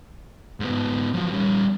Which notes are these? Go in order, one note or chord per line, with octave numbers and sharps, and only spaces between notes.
G#2 B3
F3 F#3
G3 C#4